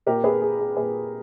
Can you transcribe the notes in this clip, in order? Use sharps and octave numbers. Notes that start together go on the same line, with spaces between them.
A#2 G4 A#4
G#4 B4
G#4
G#4
A#2 G#4 B4